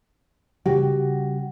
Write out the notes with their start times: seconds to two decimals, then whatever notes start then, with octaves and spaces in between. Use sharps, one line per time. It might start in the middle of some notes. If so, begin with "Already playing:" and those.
0.66 C#3 G3 F#4 G4 G5